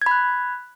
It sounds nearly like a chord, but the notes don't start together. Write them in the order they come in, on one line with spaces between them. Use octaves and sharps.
G#6 B5 F#6